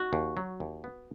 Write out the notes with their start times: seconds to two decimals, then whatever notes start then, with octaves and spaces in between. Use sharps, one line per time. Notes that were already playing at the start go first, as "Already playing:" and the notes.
Already playing: F#4
0.13 D#2
0.37 F#3
0.60 D#2
0.84 B3